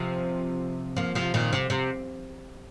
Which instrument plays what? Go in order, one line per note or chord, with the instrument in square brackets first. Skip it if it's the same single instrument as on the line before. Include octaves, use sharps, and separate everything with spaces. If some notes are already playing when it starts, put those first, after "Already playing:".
Already playing: [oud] C3 F3
F3 A#3
C3 F3
A#2 D#3
C3
C3